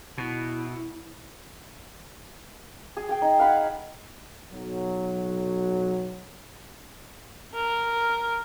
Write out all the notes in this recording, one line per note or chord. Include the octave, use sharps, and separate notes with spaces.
B2 E4
G#4
G#4 G5 G#5
D#4
F5 F#5 B5
B1 F#3
A#4